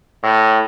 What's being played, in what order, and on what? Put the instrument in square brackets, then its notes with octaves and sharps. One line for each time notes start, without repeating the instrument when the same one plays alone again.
[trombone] A2